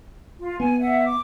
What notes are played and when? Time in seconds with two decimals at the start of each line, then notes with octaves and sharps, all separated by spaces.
0.39 F4
0.60 B3 G#5
0.79 E5 F#5
1.03 D6